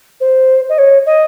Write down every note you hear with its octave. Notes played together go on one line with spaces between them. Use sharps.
C5
D#5
C#5
D#5